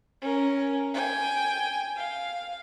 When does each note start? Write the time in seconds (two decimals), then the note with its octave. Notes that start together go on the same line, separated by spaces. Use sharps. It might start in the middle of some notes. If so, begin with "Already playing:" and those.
0.22 C#4 A#4
0.94 G5 G#5
1.97 F5